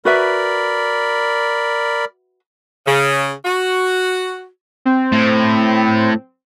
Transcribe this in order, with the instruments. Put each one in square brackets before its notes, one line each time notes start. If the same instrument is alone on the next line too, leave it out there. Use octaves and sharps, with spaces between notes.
[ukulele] F#4 B4 E5 [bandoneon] A#4 D5 B5
[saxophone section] C#3
F#4
[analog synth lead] C4
[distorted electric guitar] A2